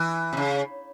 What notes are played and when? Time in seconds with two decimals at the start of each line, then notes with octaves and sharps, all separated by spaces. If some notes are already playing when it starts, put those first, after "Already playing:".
Already playing: E3
0.33 C3
0.37 C#3